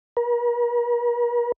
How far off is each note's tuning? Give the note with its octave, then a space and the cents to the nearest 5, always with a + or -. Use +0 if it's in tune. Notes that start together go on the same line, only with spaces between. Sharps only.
A#4 +45